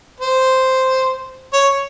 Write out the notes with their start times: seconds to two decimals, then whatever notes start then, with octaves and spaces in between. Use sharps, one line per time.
0.20 C5
1.53 C#5